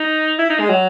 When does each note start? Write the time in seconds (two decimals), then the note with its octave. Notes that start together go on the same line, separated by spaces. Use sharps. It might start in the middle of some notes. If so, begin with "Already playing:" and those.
Already playing: D#4
0.39 E4
0.50 D#4
0.59 G#3
0.69 F#3